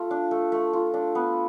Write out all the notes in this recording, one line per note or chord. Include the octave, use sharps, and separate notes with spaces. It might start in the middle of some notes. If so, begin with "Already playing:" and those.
Already playing: A3 F4
D4
A3
A3
F4
D4
B3